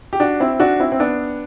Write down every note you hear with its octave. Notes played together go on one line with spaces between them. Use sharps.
G4
D4 F#4
C4 E4
D4 F#4
C4 E4
C4
B3 D4